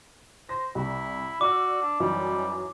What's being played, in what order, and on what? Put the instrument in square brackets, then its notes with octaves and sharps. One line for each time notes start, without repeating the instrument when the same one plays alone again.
[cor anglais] C5 [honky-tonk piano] A#6
[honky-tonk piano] C2 [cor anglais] E4
[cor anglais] F#4 [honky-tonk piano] D5 E6 [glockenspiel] D6
[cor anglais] D4
[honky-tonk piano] F#2 E3 D#4 [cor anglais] G3